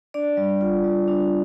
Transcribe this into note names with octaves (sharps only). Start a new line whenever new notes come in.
D4 D5
G3
F4
G3
D4